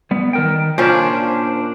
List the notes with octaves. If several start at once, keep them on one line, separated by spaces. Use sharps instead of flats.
G3 B3
D#3 A#4 G5
A#2 C#4 D4 F4 C5